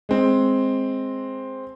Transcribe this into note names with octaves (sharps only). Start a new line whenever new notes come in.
G#3 C4